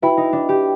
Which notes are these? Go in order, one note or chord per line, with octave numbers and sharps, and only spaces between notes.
E4 F#4 B4 E5 G5 B5
D#4
D4
G4